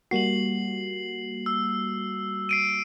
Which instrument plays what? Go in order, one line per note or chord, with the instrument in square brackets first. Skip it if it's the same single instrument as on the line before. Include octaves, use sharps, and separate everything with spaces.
[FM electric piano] G3 A#3 F#4 [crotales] C7 F#7
[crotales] E6
C7 D7 D#7